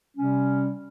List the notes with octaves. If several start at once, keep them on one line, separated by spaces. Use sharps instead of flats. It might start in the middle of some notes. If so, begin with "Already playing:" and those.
C3 G3 C#4